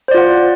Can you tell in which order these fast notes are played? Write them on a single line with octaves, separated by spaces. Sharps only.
C5 D5 F4 F#5